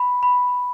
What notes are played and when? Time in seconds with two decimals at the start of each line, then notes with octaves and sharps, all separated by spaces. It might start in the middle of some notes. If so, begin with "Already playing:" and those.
Already playing: B5
0.23 B5